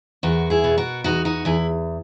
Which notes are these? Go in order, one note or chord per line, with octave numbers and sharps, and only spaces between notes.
E2 F#4 A#4
E4 G#4
B2
F#4 A#4
E2 D#4 F#4
D#4 F#4
E2 E4 G#4